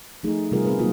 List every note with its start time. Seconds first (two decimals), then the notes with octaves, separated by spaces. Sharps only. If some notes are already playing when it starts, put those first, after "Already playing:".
0.23 F3 A3 D#4 G#4
0.52 C3 G3 C4 F4 G#4 A#4
0.65 B3 C4 G#4 A#4 B4
0.79 F#3 A#3 D#4 F4 F#4